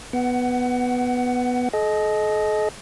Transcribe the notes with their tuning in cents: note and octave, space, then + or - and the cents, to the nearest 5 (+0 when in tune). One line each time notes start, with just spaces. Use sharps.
B3 +0 F#5 +25
A4 -45 D#5 +0